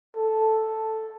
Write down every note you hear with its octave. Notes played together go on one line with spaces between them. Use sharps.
A4